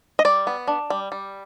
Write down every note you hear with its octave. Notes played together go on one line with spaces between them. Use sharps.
D#5
G3 D5
B3
D4
G3
G3